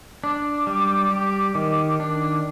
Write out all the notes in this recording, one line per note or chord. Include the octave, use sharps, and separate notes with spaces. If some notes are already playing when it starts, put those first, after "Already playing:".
D4 D6
G3
G4
D#3
D4 D6